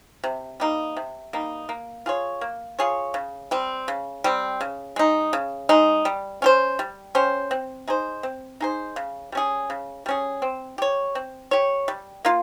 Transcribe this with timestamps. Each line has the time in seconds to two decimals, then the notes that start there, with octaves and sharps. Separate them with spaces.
0.24 C3
0.60 G3 A#3 D#4
0.97 C3
1.33 G3 A#3 D#4
1.69 A#3
2.06 F4 G#4 C#5
2.41 A#3
2.79 F4 G#4 C#5
3.14 C#3
3.51 G3 C4
3.88 C#3
4.24 G3 C4
4.61 C#3
4.96 G#3 D#4
5.33 C#3
5.69 G#3 D#4
6.05 G3
6.42 C#4 G4 C5
6.79 G3
7.15 C#4 G4 C5
7.51 C4
7.87 D#4 G#4 C5
8.23 C4
8.60 D#4 G#4 C5
8.96 C#3
9.32 G3 C#4 G#4
9.70 C#3
10.06 G3 C#4 G#4
10.42 C4
10.78 G4 C#5
11.15 C4
11.51 G4 C#5
11.88 G3
12.25 A#3 F4